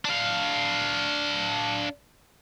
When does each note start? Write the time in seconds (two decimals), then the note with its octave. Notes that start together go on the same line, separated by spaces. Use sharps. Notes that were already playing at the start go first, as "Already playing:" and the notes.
0.05 D4 F5